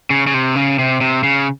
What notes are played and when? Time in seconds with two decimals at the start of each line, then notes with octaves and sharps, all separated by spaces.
0.10 C#3
0.27 C#3
0.34 C3
0.56 C#3
0.79 C3
1.01 C3
1.23 C#3